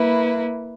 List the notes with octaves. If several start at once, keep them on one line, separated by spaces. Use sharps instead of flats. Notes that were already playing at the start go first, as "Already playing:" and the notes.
Already playing: A#3 E4 B4